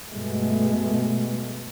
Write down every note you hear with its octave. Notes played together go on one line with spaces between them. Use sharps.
G2 B2 G#3 A3